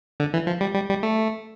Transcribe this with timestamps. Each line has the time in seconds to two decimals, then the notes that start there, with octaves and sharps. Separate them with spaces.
0.20 D3
0.34 E3
0.47 F3
0.61 G3
0.75 G3
0.89 G3
1.03 A3